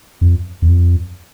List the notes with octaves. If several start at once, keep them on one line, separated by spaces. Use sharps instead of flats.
F2
E2
F2